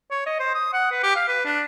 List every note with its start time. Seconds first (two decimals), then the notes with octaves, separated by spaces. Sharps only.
0.11 C#5
0.26 D#5
0.40 C5
0.55 D#6
0.73 F#5
0.92 B4
1.03 G4
1.16 F5
1.28 B4
1.45 D4